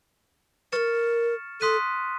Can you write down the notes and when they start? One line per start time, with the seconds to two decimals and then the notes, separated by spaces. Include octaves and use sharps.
0.72 A#4 B4 C#6 F6 A6 C#7 E7
1.61 A4 C6 D#6 F#6 B6 D#7